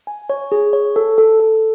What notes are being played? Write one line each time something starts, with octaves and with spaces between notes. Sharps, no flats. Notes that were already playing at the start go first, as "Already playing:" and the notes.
G#5
C#5
G#4
C#5
A4
A4
A4